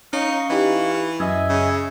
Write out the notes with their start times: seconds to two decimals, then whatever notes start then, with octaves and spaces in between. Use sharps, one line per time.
0.13 C#4 D#4 F5 C#6
0.50 E3 D#4 G4
1.20 F#2 D#5 E5 G#5
1.49 C#3